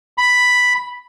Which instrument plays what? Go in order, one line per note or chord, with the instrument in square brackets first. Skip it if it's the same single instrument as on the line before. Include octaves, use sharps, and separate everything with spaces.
[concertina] B5